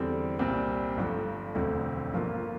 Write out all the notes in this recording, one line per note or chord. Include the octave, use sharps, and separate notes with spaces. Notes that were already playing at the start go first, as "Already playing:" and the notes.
Already playing: E2 D3 G3 C4
C2 A#2 G3 C4
G1 G2 F3 A3
E1 D2 D3 F3 C4
G1 G2 F3 A#3 F4